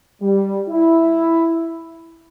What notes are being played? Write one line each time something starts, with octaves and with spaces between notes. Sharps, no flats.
G3
E4